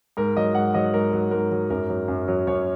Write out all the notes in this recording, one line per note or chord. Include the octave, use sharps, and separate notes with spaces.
G#2 A#4
F#3 D#5
G#2 F#5
F#3 D#5
G#2 A#4
F#3
G#2 A#4
F#3
F#2 A#4
F#3
F#2
F#3
F#2 C#5